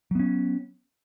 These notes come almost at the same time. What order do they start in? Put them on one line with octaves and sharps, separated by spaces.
F#3 B3 C#4